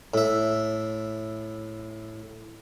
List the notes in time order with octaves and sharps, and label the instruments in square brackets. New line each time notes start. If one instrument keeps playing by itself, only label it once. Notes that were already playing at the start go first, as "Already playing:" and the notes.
[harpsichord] A2 E5